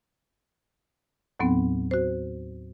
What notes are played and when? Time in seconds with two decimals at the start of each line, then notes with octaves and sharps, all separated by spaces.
1.40 D#2 A2 F#3 B3 C4
1.91 F#4 C5